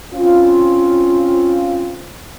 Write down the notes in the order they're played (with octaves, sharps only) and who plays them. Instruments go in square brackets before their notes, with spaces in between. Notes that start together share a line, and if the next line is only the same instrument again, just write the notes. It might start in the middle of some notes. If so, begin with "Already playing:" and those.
[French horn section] C4 C#4 F4